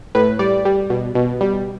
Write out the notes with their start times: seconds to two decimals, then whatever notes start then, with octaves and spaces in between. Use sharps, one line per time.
0.15 A2 B4
0.39 G3 D5
0.65 G3
0.90 B2
1.15 B2
1.41 G3